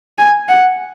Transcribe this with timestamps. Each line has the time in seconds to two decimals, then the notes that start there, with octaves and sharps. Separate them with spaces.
0.18 G#5
0.49 F#5